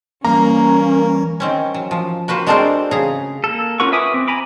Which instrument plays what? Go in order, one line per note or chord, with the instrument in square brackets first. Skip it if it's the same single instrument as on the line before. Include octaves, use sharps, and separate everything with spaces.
[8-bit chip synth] E3 G3 [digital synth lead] A#3 [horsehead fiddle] C#4 [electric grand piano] A#5
[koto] D#3 C4 C#4
F#3
F3
A#3 F#4 B4 C5
G#3 C4 D4 A4 A#4 C5
C#3 G#4 A#5
[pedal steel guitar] A#3 A4
C#4 F4 A#4 F#5 C#6
B4 E5 G#5 D6 D#6
C4
G#5 A#5 B5 D6